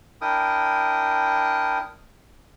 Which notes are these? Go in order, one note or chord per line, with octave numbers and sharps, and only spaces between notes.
D4 E4 A#4 G5 D#6